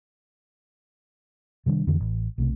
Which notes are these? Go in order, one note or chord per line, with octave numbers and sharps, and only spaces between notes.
C3 D#3 G3 D4
F2 D3 E3
A1
B1 C3 A3